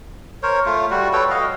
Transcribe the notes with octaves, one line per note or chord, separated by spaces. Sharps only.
A#4 C5 C#5
A3 F4
G3 F#4
A4 B4 C#5 G5
F#4 D#5 F5